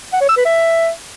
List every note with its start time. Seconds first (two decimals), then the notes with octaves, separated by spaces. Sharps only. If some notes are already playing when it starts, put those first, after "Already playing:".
0.13 F#5
0.21 C#5
0.29 E6
0.37 B4
0.45 E5